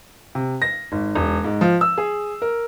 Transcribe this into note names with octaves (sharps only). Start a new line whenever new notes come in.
C3
A#6
G#1
E1
G#2
F3
E6
G#4
A#4